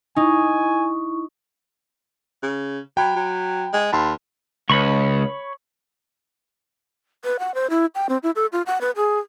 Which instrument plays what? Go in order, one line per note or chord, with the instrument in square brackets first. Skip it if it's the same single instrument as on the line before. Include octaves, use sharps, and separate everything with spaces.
[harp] D#4 [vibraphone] E4 C#6 [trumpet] G#5
[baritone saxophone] C#3
[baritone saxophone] F#3 [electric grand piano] G5 B5
[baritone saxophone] F#3
G#3
[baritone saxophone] D#2 [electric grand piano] A5 B5 C6
[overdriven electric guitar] C#2 [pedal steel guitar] C#5 B5 C#6
[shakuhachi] B4
F#5
C5
E4
G5
C4
E4
A4
F4
F#5
B4
G#4